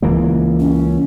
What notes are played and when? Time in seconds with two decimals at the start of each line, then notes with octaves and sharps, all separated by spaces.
0.02 C#2 E3 A#3
0.60 C#4